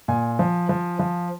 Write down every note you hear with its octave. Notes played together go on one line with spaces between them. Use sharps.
A#2 G#5
F3
F3
F3